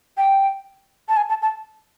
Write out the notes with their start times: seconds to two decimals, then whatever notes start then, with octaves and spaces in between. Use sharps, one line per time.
0.17 G5
1.09 A5
1.17 G#5
1.29 A5
1.42 A5